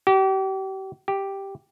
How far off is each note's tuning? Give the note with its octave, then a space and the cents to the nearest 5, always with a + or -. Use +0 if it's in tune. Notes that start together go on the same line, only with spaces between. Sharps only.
G4 -35
G4 +0